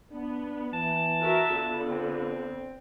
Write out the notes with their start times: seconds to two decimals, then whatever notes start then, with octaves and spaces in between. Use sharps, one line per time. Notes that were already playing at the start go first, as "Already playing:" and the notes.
0.12 B3 D4
0.73 E3 A5
1.21 F#4 A#4 E5
1.54 D3 B3 F4
1.91 C4